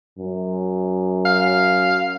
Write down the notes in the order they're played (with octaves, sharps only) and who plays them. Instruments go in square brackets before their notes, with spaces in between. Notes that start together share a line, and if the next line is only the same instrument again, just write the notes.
[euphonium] F#2
[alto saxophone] F5